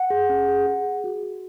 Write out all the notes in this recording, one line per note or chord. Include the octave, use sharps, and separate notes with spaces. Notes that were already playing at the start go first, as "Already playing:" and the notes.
Already playing: F#5
G#4
C#4
G#4
G#4
G#4
F#4
F#4